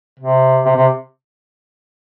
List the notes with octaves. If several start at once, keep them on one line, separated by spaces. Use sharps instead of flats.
C3
C3
C3